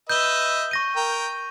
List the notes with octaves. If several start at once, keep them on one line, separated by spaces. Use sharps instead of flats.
B4 D#5 E5 G6 G7
C#6 A#6 D#7
A#4 G5